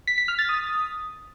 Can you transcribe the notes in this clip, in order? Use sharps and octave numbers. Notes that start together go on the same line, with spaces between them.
B6
B6
F6
A6
D#6